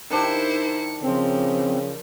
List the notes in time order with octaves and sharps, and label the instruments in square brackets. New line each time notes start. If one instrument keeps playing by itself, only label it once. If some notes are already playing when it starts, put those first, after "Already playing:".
[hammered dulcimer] D#3 D4 G4 [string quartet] E4 C5 [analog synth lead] C#7
[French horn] C#3 [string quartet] F3 [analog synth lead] C4